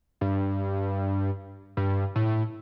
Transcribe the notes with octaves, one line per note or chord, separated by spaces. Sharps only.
G2
G2
A2